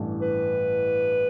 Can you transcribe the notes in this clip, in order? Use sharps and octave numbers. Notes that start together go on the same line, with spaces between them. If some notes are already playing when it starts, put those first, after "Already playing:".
Already playing: A1 G2 E3 A3
B4